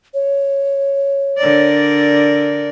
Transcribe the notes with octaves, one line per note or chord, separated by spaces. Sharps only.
C#5
D3 A#4 D5